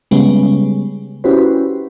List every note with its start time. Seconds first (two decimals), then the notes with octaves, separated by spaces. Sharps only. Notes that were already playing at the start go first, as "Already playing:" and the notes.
0.11 C#3 G3 G#3 B3 C#4
1.24 C#4 E4 F#4 G4 B4 C5